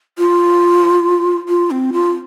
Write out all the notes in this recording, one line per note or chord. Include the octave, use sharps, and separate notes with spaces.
F4
F4
C4
F4